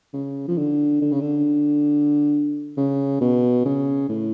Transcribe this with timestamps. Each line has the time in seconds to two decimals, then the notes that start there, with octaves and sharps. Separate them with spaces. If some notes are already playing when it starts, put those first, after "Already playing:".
0.14 C#3
0.48 F3
0.58 D3
1.02 D3
1.12 C#3
1.21 D3
2.77 C#3
3.21 B2
3.65 C#3
4.09 A2